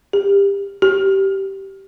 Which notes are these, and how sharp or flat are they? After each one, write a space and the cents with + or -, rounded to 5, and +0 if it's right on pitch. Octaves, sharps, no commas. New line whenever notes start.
G4 +25
G4 -15